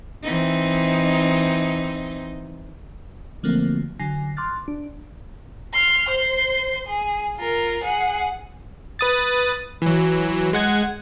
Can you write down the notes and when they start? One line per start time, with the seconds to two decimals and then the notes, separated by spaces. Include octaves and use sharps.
0.23 E3 C4 D#4
3.43 D3 F3 F#3 A3 A#3 C4
3.99 D3 F#3 G#5 A#6 C7
4.37 C6 D6 F6 F#6 A6
4.68 D4
5.73 C6 F6
6.09 C5 C6
6.87 G#4
7.37 F4 A#4
7.84 G#4 F#5
8.99 B4 D#6 A6
9.82 E3 F#3
10.53 G#3 F#5 G#6